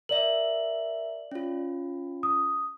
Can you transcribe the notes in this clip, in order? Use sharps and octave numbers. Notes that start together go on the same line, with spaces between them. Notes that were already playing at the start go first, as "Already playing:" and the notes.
A#4 D5 E5 F#7
C#4 F4
D#6